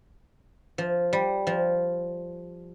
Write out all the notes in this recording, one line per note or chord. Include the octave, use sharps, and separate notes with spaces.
F3
G3
F3